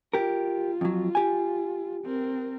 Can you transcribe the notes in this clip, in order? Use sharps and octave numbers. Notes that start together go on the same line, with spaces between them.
F4 G4 A#4
F2 F#3
G4 G#5
C4 A#4